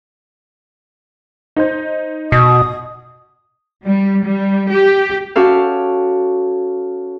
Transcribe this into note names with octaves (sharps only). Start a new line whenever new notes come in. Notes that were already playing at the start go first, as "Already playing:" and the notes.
D#4 C5 G6
B2 D#6
G3
G3
G4
C#4 F#4 G4 A4 F5